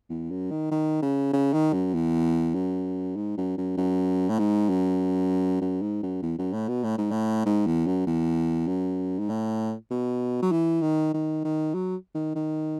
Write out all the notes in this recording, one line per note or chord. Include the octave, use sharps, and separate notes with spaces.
E2
F#2
D#3
D#3
C#3
C#3
D#3
F#2
E2
F#2
G#2
F#2
F#2
F#2
A2
G#2
F#2
F#2
G#2
F#2
E2
F#2
A2
B2
A2
G#2
A2
G#2
E2
F#2
E2
F#2
G#2
A2
B2
F#3
E3
D#3
D#3
D#3
F#3
D#3
D#3